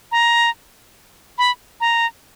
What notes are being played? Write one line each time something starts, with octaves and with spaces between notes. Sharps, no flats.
A#5
B5
A#5